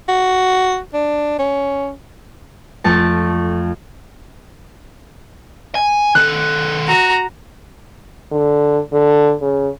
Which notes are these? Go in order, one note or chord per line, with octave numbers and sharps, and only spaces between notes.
F#4
D4
C#4
F2 A3 A5
G#5
D#3 A4 F#6
F#4 A#5
D3
D3
C#3